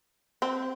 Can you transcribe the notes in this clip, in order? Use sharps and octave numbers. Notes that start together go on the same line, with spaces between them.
C4